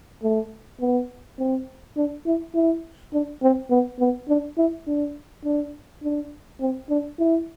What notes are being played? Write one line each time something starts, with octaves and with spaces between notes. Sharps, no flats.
A3
B3
C4
D4
E4
E4
D4
C4
B3
B3
D4
E4
D4
D4
D4
C4
D4
E4